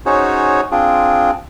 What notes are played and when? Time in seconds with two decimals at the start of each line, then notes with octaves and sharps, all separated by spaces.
0.06 C#4 D#4 F#4 G#4 C5 C#5
0.71 C4 D4 F4 G#4